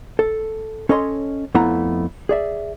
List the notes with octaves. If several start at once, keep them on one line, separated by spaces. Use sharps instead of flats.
A4
C#4 A4 C#5 D#5 A#5 C6
F2 A3 B3 E4 F#5 A#5
G#4 D5 E5